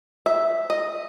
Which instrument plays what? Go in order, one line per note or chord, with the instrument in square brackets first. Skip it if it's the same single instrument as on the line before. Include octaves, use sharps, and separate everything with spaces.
[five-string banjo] E5
D#5